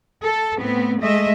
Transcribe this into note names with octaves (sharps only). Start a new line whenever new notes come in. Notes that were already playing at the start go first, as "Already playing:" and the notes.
A4
A2 B3 C4
G#3 A3 D#5 E5